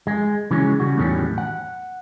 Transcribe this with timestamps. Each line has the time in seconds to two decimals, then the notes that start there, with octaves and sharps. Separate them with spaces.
0.07 G#3
0.51 C#3 E3 F#3 G#3 C4 C#4
0.80 C#3 G3 F#4
0.97 E2 A2 D#3 F#3 G3 C#4
1.38 F#5